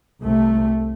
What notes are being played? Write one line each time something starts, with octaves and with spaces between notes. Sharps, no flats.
C2 C3 A3